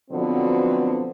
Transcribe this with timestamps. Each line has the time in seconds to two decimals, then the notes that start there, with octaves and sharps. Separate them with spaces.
0.10 B2 D3 F3 F#3 B3 C4